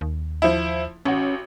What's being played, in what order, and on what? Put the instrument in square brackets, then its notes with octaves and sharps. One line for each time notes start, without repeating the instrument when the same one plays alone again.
[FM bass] D#2
[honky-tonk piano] F3 E4
[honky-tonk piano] A1 F#4 [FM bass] C#4